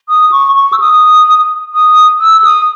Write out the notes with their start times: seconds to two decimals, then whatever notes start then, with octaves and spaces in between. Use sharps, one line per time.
0.09 D#6
0.32 C#6
0.56 C#6
0.73 E6
0.80 D#6
1.74 D#6
2.20 E6
2.44 D#6